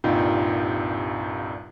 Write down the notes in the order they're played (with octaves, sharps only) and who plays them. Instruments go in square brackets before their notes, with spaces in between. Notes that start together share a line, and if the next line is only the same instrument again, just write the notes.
[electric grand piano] C2 G2 A#2 D#4 F4 G5